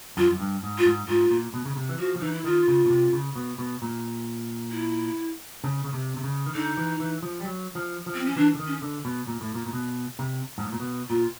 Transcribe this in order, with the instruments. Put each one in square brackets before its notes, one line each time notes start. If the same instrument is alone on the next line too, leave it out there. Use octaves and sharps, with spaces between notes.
[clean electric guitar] F#2 [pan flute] F4
[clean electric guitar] F#2
G2
G#2
[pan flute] F4
[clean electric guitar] G#2
[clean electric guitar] G#2 [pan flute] F4
[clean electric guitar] A#2
B2
C#3
C3
E3
[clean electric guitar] F3 [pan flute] F#4
[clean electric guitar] F3
[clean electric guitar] E3 [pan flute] D#4
[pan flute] E4
[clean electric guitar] D#3 [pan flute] F4
[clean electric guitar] C#3
B2
C3
C#3
B2
B2
A#2
[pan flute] E4
[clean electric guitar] C#3
C#3
C3
C3
C#3
D#3
[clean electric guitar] D3 [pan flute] D#4
[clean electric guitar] E3
E3
F3
G3
F#3
F3
F3
[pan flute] C4
C#4
[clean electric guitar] E3 [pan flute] D4
[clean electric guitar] D3
D#3
[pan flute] C#4
[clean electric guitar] D3
B2
A#2
A2
A#2
A#2
B2
C3
G#2
A2
A#2
B2
[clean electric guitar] A#2 [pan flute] F4